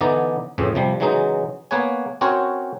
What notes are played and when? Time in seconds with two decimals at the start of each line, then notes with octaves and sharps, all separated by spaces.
0.01 D3 E3 B3 D#4 D5 A#5
0.58 F2 A2 C#3 E3
0.75 C3 F3 G3
1.00 C#3 E3 F#3 G#3 D#4
1.71 A#3 B3 B4 C#5 G#5
2.21 C4 C#4 F#4 A#4 C5 C#5